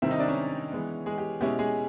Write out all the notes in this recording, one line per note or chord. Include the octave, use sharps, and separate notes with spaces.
C3 D#3 G3 C4 E4 E5
D#4 D#5
D4 D5
C#4 C#5
E3 G#3 B3
G#3 G#4
G4
B2 G#3 C#4 E4 G4
G#3 G#4